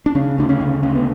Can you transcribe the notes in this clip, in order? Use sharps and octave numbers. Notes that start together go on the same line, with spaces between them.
D4
C#3 C#4
D2 D4
C#4
C#3
D2 C#4
B3